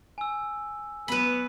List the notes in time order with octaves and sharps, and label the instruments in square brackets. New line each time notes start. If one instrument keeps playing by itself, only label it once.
[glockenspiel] G#5 E6
[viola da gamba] F#3 B3 [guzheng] B4 B5